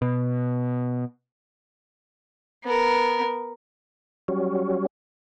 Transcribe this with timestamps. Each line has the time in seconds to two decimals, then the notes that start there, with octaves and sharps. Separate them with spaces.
0.02 B2
2.64 B3 A#4
4.28 F#3 G3 C#4